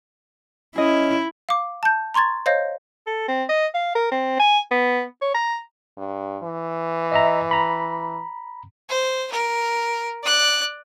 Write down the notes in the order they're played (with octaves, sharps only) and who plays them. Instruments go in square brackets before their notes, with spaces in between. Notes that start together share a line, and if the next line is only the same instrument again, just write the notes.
[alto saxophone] C#4 [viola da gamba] E4 [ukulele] G#4 D#5
[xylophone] F5 D6
A5 G6
A#5 C6 C#6 G#6 A6
C5 C#5 D#5 F5 G6 A#6
[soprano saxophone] A4
C4
D#5
F5
A#4
C4
G#5
B3
C#5
A#5
[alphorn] G2
E3
[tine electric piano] D#5 E5 A#5
A#5 B5
[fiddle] C5
A#4
D5 F#6